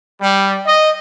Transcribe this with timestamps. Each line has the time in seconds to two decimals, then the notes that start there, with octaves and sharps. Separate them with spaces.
0.22 G3
0.66 D#5